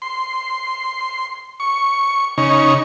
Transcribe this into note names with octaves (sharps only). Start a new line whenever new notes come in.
C6
C#6
C#3 D#4 C#6